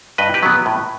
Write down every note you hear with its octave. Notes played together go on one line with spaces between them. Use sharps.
G2 B4 D#5
G4 B4
F#3 B3
A2